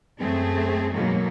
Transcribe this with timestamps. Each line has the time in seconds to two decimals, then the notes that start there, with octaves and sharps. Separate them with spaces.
0.19 F#2 A3 C4 G#4
0.93 G#2 B2 D#3 F#3 A#3